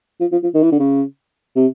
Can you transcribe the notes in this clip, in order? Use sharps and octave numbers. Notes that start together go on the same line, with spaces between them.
F3
F3
F3
D#3
E3
D3
C#3
C3